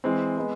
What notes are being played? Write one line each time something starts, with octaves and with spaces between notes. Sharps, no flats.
E3 G#3 C4
G#3 B3